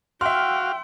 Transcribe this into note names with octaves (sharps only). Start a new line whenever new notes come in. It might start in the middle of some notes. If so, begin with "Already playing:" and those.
F#4 E5 F5 G5 C6 F6